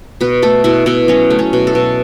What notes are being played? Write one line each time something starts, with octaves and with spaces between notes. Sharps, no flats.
B2 B4
A3 A4
B2 E4
B2 E4
F#3 C#4
A3
C#4
B2
A4
B2